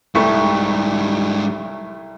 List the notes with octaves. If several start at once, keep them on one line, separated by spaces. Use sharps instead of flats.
C2 G#2 G3 A3 C#6